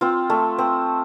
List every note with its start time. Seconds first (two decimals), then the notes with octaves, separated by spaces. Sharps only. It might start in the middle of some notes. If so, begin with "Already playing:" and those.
0.01 C4 F4
0.30 A3
0.58 C4